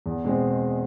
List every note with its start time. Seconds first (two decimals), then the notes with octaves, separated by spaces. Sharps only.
0.06 E2
0.25 B2 G#3 C4